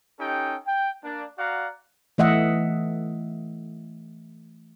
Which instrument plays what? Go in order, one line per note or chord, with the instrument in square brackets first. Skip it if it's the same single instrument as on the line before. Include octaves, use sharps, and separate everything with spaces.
[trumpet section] C#4 D#4 G4 A4 G5
G5
A#3 D4
F#4 D5 F5 F#5 A#5
[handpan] E3 A3 D#5 E5 F#5